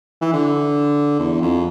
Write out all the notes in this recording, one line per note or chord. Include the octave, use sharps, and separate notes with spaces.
E3
D3
E2
F2